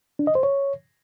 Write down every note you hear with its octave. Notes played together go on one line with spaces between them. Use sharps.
D4
D#5
C5
C#5